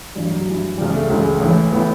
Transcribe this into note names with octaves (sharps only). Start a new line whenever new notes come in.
A1 G2 E3 F#3
F#3
A1 G2 E3
C#2 C#3 E3 G3
A3
C#2 C#3 E3
A1 A2 E3
A2 E3 B3